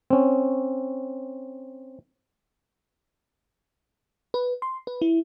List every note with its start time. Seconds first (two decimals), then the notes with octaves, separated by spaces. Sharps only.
0.10 C4 C#4
4.34 B4
4.62 C6
4.87 B4
5.02 E4